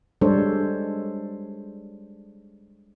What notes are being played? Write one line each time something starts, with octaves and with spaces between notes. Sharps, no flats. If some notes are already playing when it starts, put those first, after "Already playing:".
G3 G#3 D4 A4 C5 C#5